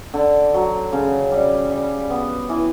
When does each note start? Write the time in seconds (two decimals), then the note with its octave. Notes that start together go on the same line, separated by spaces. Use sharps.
0.14 D3
0.54 F#3
0.93 C#3
1.31 G3
1.71 G3
2.10 B3
2.49 E3